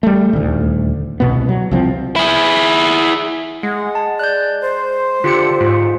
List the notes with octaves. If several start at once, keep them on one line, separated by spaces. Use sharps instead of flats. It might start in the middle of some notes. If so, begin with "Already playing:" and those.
G3 A3
D#1 D2
C2 B2 B3
F#3
C2 F3 C4
E4 G#4
G#3 F#5
A5
D5 F#6 G6
C5
D3 F4 G4 C#7
G#2 F4